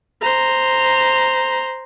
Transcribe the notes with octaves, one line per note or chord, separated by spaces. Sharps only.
C5 A#5